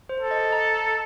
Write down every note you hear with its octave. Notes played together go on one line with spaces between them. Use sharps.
C5
A4
D#5
A#5